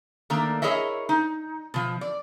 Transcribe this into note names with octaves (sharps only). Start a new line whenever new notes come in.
D#3 A3 A#3 D4
E4 G#4 A#4 C#5 D#5 E5
D#4
B2 F3
D5